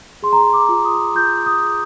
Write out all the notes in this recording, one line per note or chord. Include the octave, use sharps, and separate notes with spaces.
G#4 C6
A#5
C6
D6
F4
D#6
F4 G6
D#6
G#4